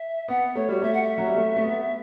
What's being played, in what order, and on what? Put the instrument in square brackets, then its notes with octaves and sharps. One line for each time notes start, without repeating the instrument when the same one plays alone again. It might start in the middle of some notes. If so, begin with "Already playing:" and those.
Already playing: [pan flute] E5
[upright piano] B3 [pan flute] F#5
[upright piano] A3 [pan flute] C#5
[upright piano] G3 [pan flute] F#4
[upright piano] A3 [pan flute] E5
[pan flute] F#5
E5
[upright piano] F#3
G3
A3
A3
B3